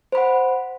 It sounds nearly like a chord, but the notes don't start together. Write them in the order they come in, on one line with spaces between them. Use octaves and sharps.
C5 B5 F#5